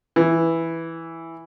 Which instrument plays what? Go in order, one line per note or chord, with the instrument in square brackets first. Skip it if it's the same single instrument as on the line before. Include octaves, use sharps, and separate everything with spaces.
[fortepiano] E3